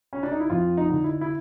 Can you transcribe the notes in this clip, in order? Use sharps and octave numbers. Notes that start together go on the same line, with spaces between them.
C#4
D4
D#4
E4
F2 F4
D#4
D3
E4
E4